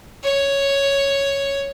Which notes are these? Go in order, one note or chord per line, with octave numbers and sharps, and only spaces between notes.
C#5